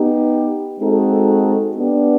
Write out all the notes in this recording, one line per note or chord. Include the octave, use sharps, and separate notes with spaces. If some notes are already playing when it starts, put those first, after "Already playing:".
Already playing: B3 D#4 G4
G#3 C4 D#4 F#4 A4
B3 D4 G4